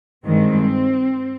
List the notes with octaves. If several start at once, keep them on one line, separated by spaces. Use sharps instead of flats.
G2 D#3 G#3 C4